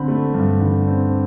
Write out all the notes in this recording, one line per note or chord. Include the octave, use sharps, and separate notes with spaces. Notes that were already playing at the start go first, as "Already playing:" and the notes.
Already playing: D3 C4 B5
A3
G2
D3
C4